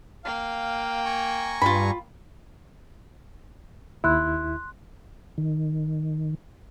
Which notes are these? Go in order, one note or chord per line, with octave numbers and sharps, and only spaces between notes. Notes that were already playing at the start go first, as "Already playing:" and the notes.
A#3 F5 G5
G#5 A#5 C#6
G2 F4 B5
D#2 E4 C6 F#6
D#3